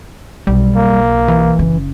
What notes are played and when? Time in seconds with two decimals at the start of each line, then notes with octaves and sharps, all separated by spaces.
0.47 B1 G3
0.76 A#3
1.28 E3
1.59 F#1 C#3